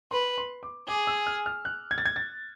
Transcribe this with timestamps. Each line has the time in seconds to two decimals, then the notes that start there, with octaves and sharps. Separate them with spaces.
0.11 B4 C6
0.38 C6
0.63 D6
0.88 G#4 D6
1.07 E6
1.27 F6
1.46 F6
1.65 F#6
1.91 G#6
1.98 A6
2.05 G#6
2.16 A6